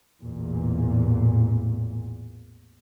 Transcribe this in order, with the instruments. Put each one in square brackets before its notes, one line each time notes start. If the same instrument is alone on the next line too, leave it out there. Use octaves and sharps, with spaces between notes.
[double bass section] A1 E2 A#2